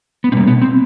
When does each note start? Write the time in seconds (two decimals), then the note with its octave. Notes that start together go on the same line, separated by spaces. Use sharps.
0.24 B3
0.32 B2 G3 A#3 C4
0.47 B3
0.62 C4